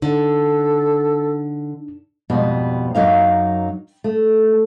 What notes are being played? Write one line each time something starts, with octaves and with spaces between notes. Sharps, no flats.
D3 D4 D#4 A4
F2 G#2 B2 G3 B3
F#2 F#3 A#3 D#4 F5
A3